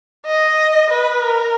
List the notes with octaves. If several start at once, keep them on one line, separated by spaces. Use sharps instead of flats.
D#5
B4
A#4